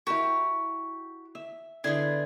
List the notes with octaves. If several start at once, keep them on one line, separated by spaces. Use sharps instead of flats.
E4 F#4 G4 A#4
E5
D3 B3 E4 G#4 C5